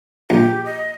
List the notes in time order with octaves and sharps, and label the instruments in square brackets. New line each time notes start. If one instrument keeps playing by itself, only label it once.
[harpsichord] A#1 [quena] G4
[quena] D#5